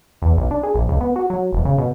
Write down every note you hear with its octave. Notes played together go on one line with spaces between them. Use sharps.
E2
B1
D4
G#4
A#1
C#2
B3
F#4
F#3
E1
C#3
B2